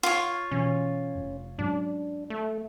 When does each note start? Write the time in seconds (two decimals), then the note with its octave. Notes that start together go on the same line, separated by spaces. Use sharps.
0.03 F4 C#5
0.51 B2 E3 C#4
1.15 F1
1.59 G#2 F#3 C#4 D4
2.30 A3